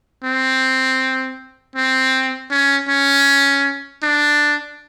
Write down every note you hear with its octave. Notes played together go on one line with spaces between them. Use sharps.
C4
C4
C#4
C#4
D4